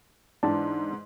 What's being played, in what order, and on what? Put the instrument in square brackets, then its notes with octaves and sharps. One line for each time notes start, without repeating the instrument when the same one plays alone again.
[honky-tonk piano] G#2 E3 [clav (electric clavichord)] D4 A5